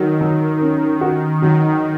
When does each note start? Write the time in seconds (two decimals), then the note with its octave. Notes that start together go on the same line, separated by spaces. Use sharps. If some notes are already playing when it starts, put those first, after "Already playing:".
Already playing: D#3 F#3
0.21 F#3
0.61 C#4
1.01 F#4
1.42 D#3 F#3